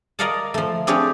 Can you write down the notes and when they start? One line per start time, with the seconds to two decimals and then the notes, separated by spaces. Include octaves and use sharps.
0.19 A#4 D5 D#5 F5 F#5 A5
0.54 F3 A3
0.87 C4 D4 G4 G#4 C#5 F5